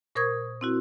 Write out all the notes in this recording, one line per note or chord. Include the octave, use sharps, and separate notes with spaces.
A#2 A#4 C5 C#6 D#6 G#6
C4 E4 F#4